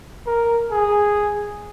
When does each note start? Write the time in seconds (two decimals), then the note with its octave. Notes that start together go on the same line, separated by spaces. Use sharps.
0.27 A#4
0.71 G#4